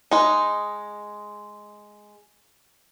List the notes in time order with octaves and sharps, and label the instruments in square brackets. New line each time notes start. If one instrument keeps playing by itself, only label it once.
[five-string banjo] G#3 D#4